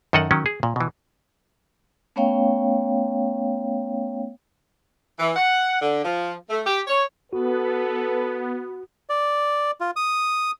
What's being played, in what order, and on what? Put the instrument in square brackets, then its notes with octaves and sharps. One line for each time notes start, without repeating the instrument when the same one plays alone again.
[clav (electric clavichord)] F#2 D#3 A4 D#5 F#5
D#3 F#3 C#4
G#4
A#2
B2 E3
[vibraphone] A3 B3 C#4 C#5 F5 G5
[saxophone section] E3
F#5
D3
F3
A3
G4
C#5
[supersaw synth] B3 [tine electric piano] F#4 [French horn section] A4 B4
[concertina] D5
F4
D#6